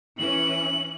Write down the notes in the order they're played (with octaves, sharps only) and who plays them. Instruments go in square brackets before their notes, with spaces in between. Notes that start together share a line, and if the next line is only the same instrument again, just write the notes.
[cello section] E3 C#4 [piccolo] F#7